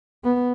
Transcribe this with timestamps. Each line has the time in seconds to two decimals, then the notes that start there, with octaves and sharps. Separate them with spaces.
0.24 B3